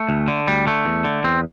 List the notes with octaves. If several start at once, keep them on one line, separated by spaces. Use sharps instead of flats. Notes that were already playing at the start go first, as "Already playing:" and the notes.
Already playing: A3
D2
D3
D2 G3
D3 A3
E2
D3
E2 C4